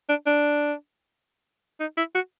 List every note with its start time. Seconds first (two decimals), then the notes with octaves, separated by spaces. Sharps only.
0.09 D4
0.26 D4
1.80 D#4
1.97 E4
2.15 F#4